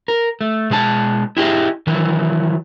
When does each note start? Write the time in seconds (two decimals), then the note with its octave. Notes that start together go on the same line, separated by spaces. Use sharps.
0.08 A#4
0.41 A3
0.70 B2 G#3 A4 A5
1.37 E4 G4 G#4 D#5 E5
1.87 D#3 E3 F#3